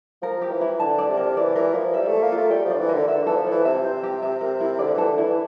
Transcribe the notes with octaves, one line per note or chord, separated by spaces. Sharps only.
F3 A#4
G4
E3
E4
D3 A5
D5
C3
A#4
E3 D5
E3 A#4
F3 E4
G3 E5
A3
A4
A#3
F4
A3
G3 G5
F3 D5
D3
E3
D3 A#4
D3 E5
E3 A4
F3
E3 E4
C3 E5
C5
G4
E5
A#4
E4
D3 D5
E3 A4
D3
E3 E4